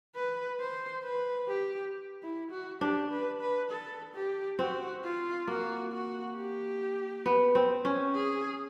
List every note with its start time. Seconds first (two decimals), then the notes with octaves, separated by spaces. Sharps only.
0.15 B4
0.60 C5
1.04 B4
1.48 G4
2.23 E4
2.52 F#4
2.81 D4 G4
3.11 B4
3.41 B4
3.71 A4
4.14 G4
4.59 C4 F#4
5.04 F4
5.47 A#3 F#4
5.92 F#4
6.36 G4
7.26 B3
7.55 C4
7.85 C#4
8.14 G#4